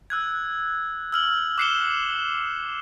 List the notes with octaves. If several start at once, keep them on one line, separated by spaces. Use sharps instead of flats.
E6 F#6 G#6
E6 F6 F#7
D6 F#6 C7 C#7 E7 G7